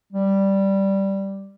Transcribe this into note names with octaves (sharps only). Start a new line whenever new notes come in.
G3